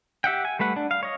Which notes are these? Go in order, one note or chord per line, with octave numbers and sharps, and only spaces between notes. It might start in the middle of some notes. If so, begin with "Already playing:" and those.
G4 E5 F#5 G5
G#5
G3 A3 B4 F#5
D4
F5
C#5 D#5